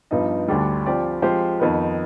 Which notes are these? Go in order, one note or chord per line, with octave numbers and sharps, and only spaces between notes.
G2 F3 B3 D#4
D2 D3 G3 D4
F3 C4 G4 D5
F3 G#3 C4 G4 C5
F2 D#3 B3 D#4 B4